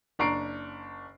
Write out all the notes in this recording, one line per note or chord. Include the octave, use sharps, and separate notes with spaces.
F#1 D4 A#5 C#6 C7 D7